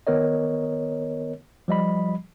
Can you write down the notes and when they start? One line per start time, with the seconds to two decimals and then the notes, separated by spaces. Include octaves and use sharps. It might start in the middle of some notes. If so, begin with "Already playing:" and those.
0.07 D#3 B3 A#4 C#5 D#5
1.68 F3 G3 D#5 B5